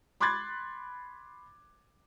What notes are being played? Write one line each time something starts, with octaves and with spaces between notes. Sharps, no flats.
B5 C6 D6 F#6 G#6 A6